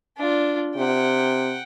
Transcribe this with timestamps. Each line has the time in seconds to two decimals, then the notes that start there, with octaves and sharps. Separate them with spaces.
0.18 D4 F4
0.77 C3 F#5 G5